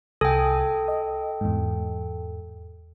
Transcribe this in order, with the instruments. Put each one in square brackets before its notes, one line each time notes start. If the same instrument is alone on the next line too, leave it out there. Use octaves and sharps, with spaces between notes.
[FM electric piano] C2 G#5 D#6 [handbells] A4 G5
[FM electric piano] D#5
E2 G#2